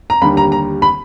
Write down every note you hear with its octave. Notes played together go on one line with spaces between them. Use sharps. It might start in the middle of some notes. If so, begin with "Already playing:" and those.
A#5
D#2 D3 G3 B5
A#5
A#5
B5